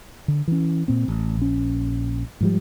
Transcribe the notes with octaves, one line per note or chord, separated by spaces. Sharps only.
D3
E3 C#4
A#2 C4
A1
A#1 C#4
G#2 F3 G3